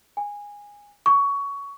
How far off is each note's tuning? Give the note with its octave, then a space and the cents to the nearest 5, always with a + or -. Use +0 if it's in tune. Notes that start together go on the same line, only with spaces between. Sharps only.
G#5 -15
C#6 +20